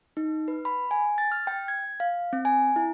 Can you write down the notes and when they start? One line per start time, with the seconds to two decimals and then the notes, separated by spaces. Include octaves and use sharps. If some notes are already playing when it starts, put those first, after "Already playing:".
0.17 D#4
0.48 B4
0.65 B5
0.91 G#5
1.18 A6
1.32 F6
1.47 G5
1.68 G#6
2.00 F5
2.33 C4
2.45 G#5
2.76 E4